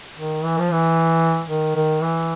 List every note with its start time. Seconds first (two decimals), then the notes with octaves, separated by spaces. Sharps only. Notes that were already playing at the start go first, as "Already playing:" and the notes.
0.18 D#3
0.44 E3
0.59 F3
0.72 E3
1.49 D#3
1.76 D#3
2.01 E3